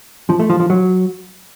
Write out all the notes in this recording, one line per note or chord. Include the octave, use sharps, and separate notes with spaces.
F3
A3
F3
F3
F#3